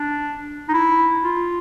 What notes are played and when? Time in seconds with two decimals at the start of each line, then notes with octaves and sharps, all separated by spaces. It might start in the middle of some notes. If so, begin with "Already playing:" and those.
Already playing: D4
0.69 D#4
0.74 E4
1.24 F4